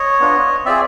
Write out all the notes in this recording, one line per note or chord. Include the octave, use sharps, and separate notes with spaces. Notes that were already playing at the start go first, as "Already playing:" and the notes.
Already playing: C#5 D#5
B3 D4 F4
C4 F4 G#4 D5 E5